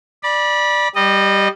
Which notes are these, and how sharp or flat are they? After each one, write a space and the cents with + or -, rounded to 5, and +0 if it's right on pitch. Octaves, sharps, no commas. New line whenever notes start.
D5 +10 B5 -25
G3 +0 D#5 -25